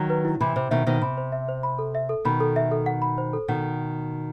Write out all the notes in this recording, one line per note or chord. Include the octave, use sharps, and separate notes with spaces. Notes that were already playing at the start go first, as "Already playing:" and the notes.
Already playing: D#3 F#3
B4
E4
C3 E3 B5
C3 C5
B2 D#3 E5
B2 D#3 C5
C3 B5
C5
E5
C5
B5
A4
E5
A4
B2 D#3 B5
A4
E5
A4
F#5
B5
C5
A4
B2 D#3 F#5